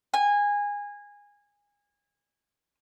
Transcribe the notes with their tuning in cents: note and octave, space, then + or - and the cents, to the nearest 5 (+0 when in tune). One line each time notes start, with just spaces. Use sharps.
G#5 -20